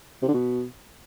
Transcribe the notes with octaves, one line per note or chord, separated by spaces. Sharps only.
C3
D3
B2